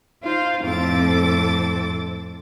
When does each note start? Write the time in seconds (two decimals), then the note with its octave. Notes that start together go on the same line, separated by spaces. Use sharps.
0.24 D#4 F4 C5 F5
0.63 F2 A2 C4 A4 D6 A6